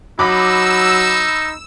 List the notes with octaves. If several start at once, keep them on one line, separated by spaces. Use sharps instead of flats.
F#3 D#4 B5 D6 E6